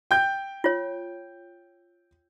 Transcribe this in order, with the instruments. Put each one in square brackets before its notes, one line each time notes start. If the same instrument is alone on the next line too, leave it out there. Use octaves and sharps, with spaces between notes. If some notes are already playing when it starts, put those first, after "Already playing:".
[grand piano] G5 G6
[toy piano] F4 C#5